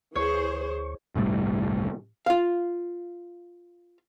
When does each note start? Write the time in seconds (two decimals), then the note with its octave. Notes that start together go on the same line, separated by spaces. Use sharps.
0.16 D2 E3 G#4 C5 C#5 C#6
1.15 G1 C2 A2 G3
2.26 F4 F5